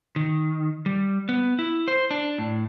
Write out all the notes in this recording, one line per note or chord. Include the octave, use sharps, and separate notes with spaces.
D#3
G3
B3
E4
C5
D4
A2